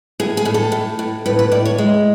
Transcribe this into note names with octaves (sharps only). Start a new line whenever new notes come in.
A2 G#4
G#4
A2
A4
A2
A2
A2 B4
B4
A2 D5
C#5
G#3